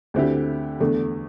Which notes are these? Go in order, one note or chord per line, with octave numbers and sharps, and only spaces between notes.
D2 D3 C4 E4 G4
E2 D3 A3